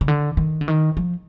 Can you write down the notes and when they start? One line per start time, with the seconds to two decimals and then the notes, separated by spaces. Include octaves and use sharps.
0.01 C#3
0.08 D3
0.37 D#3
0.61 D3
0.68 D#3
0.97 F3